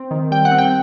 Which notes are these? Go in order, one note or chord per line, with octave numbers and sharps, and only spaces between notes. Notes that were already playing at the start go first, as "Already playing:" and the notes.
Already playing: C4
D#3
G3 G5
F#5
C4
G5